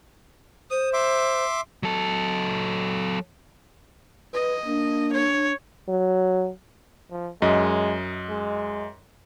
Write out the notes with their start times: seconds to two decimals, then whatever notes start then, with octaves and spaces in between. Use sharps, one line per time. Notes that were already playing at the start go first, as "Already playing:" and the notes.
0.71 C5 D#6
0.93 E5 C6 D6
1.83 F#3 A4
4.34 B4 D#5
4.66 A#3 D4
5.13 C#5
5.89 F#3
7.11 F3
7.42 F#2 G#3 D#5
8.29 G#3